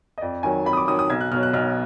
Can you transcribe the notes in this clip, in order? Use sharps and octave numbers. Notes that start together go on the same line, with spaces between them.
D#5
F2 D5
D#3 F#3 G#5
F2 B5
D#6
D6
D#3 F#3 D#6
D#6
B1 G#6
F#6
B2 F6
F#3
F#6
B1 F6